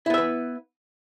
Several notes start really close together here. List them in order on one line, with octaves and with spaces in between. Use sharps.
E4 B3 E5 B4